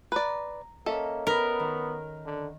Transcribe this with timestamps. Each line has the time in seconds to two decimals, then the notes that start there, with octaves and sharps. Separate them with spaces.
0.12 B4 D5 A#5
0.86 A#3 C#4 A4 D#5 E5
1.27 B3 A#4 B5
1.60 D#3
2.25 D3